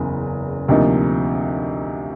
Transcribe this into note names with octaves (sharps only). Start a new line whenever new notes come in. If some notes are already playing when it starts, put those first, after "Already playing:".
Already playing: F#1 E2 C#3
D2 C3 F3 A#3 D#4